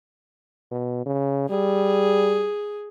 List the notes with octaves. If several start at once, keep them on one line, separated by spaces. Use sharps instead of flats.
B2
C#3
G3 G#4